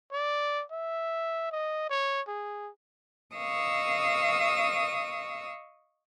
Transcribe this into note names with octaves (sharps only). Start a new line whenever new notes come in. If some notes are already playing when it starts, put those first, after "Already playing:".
D5
E5
D#5
C#5
G#4
D#5 F5 C#6 D#6 E6